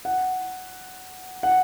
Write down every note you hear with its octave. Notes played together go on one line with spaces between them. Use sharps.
F#5
F#5